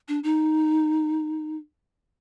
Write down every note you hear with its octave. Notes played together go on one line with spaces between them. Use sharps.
D4
D#4